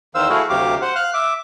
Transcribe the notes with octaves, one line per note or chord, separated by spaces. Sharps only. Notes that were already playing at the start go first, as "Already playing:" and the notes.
E2 D#3 C5 F5 E6
A3 E4 F#4 G#4 F5
D2 C3 F#3 G4 F5 D6
C5 F#5
F5 F6 F#6
E5 D6